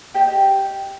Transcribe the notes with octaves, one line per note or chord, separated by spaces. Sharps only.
G4 C5 D#5 G5